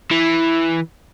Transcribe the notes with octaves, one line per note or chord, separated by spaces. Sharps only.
E3